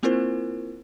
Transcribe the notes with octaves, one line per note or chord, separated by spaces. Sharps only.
A#3 C4 E4 F4 A#4 C5